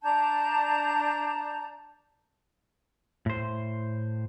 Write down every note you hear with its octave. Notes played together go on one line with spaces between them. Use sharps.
D4 A5 A#5 G6
A2 C5